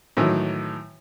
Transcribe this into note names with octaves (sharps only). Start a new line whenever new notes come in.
A2 D#3 E3 F#3